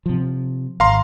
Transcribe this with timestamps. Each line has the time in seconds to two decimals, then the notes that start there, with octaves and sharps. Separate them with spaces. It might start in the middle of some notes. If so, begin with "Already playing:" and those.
0.06 C3 F3
0.80 G#1 F5 A#5 C6